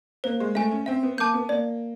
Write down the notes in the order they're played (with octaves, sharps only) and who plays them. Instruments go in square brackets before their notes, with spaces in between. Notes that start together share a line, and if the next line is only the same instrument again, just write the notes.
[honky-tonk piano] A#3 [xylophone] C5
[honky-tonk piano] G#3
[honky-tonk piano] A3 [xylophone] E5 G#5
[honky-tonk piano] C#4
[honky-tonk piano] C4 [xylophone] E5
[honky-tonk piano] B3
[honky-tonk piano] A#3 [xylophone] A5 D6 G6
[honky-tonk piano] B3
[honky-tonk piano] A#3 [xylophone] D5